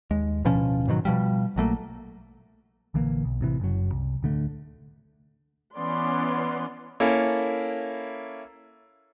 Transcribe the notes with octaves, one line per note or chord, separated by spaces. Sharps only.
D#2 G#3
D1 B2 F3 C#4
G#2 B2 D#3 F#3
B2 F3 G3
A#1 F#3 A3 A#3
A#1 D3 E3 A#3
B1
A1 C3 E3
F#1 F#2 F#3
C2
D1 D3 A3
E3 B3 C#4 D5 C6
A#3 C#4 E4 A4